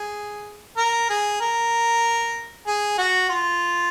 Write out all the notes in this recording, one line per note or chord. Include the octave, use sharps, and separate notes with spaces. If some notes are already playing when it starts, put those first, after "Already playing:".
Already playing: G#4
A#4
G#4
A#4
G#4
F#4
F4